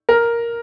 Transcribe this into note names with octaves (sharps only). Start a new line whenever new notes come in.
A#4